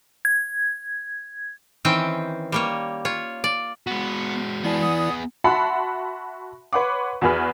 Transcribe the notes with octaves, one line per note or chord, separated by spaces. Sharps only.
G#6
D#3 E3 C4 C#4 G5
G3 A#3 C#5
F4 C#5
D5
G#3 B3 F#4
E3 B3 E4 G#4 D5 A5
F#5 D#6
F#4 E5 F#5 A5 B5 C6
B4 C#5 F#5 C6 D6
E2 F#4 G#4 B4 F6